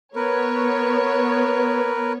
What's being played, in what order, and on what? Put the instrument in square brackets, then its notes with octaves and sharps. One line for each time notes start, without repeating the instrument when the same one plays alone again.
[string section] B3 C#5 [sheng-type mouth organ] A#4 B4